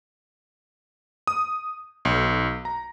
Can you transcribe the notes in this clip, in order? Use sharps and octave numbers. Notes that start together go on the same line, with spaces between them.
D#6
B1
A#5